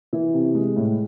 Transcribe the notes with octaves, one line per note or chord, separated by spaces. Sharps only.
E3
C3
G#3
A2